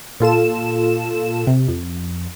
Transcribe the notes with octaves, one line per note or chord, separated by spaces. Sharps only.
A#2 F4 A4 E7
C3
F2